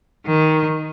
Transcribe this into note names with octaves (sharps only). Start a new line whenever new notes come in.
D#3